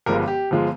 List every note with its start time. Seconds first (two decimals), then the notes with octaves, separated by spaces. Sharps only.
0.06 G1 G2 F3 G#3 A#4
0.28 G4
0.51 G1 F3 G#3